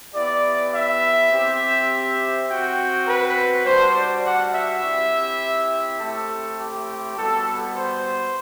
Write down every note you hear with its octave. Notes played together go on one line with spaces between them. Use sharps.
B3 E4 G4 D5
E5
C4 G4
C4 F#4 G5
B4
G3 D4 F#4 C5
D5
F#5
E5
C4 E4 G4
A3 C4 E4 G4 A4
G4
G3 B3 F#4 A4
C5